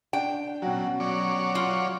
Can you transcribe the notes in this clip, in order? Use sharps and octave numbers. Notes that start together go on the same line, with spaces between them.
D4 G5
B2 F#3 C#4 F#4
F#3 C#5 D5
F4 F#7